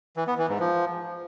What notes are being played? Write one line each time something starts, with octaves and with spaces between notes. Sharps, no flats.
E3
B3
E3
G#2
F3